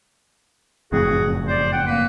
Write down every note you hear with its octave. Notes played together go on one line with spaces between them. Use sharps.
F#1 F2 A2 F#4 G#4
C5 D5
F#5 G5
A#3 B4